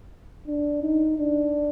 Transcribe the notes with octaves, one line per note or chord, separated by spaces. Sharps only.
D4
D#4
D4